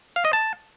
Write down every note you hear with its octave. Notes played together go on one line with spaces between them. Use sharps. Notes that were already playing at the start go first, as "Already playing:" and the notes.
F5
D#5
A5